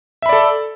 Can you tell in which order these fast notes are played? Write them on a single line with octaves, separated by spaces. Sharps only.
E5 B5 D5 A4